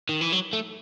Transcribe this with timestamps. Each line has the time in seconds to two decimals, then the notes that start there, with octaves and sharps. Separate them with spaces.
0.09 D#3
0.21 E3
0.32 F#3
0.53 A3